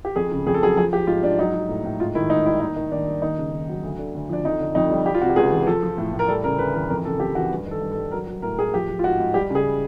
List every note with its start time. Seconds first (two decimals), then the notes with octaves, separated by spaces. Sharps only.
0.05 G4
0.16 F2 G#4
0.31 C#3
0.47 F2 G#4
0.54 A4
0.62 F#3 G#4
0.77 F3 G#4
0.93 F3 G4
1.07 G#2 F4
1.23 G#2 D4
1.39 F#3 D#4
1.54 F#3
1.69 A2
1.84 A2
2.00 G#2 F4
2.15 D#3 E4
2.30 G#2 D#4
2.46 G3 E4
2.60 D#2 D#4
2.76 D#3
2.91 D#2 D4
3.07 G3
3.22 D#2 D#4
3.37 C#3
3.53 D#2
3.69 F#3
3.83 D2
3.98 D3
4.15 D2
4.29 F3 D4
4.44 F2 D#4
4.60 D3
4.75 F2 D#4
4.91 G3
5.06 G3 G4
5.14 F4
5.21 C3 F#4
5.29 G4
5.36 C#2 G#4
5.51 E3
5.67 F3 A4
5.83 F3
5.98 A2
6.13 A2
6.19 A#4
6.28 G3 A4
6.44 C#3 A#4
6.58 D2 B4
6.74 E3 A#4
6.90 F2 A#4
7.05 C#3 A4
7.20 F2 G4
7.35 E3 F#4
7.51 G2
7.66 D#3
7.71 A4
7.81 G2
7.92 A4
7.97 G3
8.11 F#3 A#4
8.27 F#3
8.42 A2 A#4
8.58 A2 G#4
8.73 F3 G4
8.89 F3
8.99 F4
9.04 G#2 F#4
9.19 G#2
9.34 G3 G4
9.50 C#3 G#4